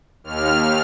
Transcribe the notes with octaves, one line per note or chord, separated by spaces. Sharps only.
D#2 F6